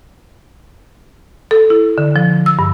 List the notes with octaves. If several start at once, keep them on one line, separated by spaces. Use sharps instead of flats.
A4
E4
D3
F3
E6
G2